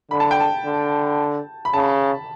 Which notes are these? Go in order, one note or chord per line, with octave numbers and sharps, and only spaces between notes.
D3 B5
A5
G5
A5
D3
B5
C#3 A5